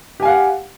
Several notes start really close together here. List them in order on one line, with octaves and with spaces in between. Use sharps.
G4 G#5 F5 F#5